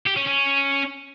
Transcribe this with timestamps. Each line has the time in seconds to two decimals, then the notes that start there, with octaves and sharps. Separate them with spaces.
0.06 G4
0.16 C#4
0.26 C#4